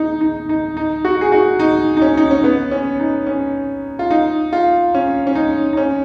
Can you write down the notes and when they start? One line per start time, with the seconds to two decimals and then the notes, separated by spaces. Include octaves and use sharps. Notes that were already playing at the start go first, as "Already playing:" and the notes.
Already playing: D#4
0.21 D#4
0.49 D#4
0.77 D#4
1.05 F#4
1.21 G#4
1.32 F#4
1.59 D#4
1.97 D#4
2.02 C#4
2.17 D#4
2.31 C#4
2.44 B3
2.71 C#4
3.00 D#4
3.27 C#4
3.99 F4
4.10 D#4
4.53 F4
4.94 C#4
5.27 C#4
5.35 D#4
5.73 D#4
5.77 C#4